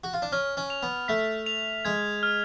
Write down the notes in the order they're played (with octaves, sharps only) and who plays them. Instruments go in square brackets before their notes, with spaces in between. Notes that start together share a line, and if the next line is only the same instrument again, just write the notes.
[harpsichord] F#4
F4
D4
[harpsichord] C#4 [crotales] F6
[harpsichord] C#4
[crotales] F7
[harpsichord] B3
[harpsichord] A3 [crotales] B6
[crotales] F7
[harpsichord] G#3 [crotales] G#6
[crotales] F6